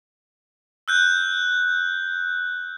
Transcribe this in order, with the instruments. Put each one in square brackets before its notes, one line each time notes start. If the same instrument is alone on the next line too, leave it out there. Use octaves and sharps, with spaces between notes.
[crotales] E6 F#6 G6